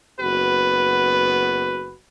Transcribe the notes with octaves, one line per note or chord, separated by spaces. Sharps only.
F#1 B3 F#4 B4